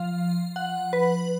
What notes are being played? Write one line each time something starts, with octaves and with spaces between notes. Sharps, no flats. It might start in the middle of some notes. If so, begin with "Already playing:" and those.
Already playing: F3 F5
F#5
B4